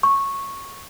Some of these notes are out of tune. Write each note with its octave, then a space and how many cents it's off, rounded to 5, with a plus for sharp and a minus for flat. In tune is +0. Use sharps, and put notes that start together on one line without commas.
C#6 -10